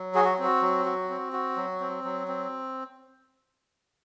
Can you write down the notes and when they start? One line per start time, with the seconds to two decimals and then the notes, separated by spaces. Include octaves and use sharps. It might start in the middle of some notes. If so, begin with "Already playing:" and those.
Already playing: F#3
0.15 F#4 G#4
0.25 F#4
0.39 C4 F#4
0.62 F#3
0.85 F#4
1.10 C4
1.33 F#4
1.56 F#3
1.80 C4
2.04 F#3
2.28 C4